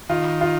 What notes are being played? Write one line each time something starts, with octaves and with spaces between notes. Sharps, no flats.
D#3 F4
F4